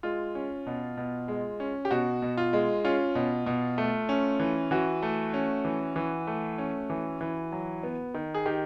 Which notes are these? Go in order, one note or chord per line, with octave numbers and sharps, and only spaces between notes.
G#3 F4
C#4
B2
B2
G#3
C#4
G4
B2 F#4
B2
F4
G#3
C#4 F4
B2
B2
A3
C#4
E3
E3 F#4
A3
C#4
E3
E3
A3
C#4
E3
E3
F#3
B3
D#3
G#4
D#3 G4